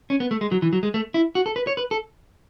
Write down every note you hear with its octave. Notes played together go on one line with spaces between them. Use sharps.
C#4
B3
A3
G#3
F#3
E3
F#3
G#3
A3
E4
F#4
A4
B4
C#5
B4
A4